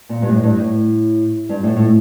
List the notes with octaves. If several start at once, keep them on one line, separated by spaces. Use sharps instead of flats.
A#2
G2
A2
G2
A2
G2
A2
A2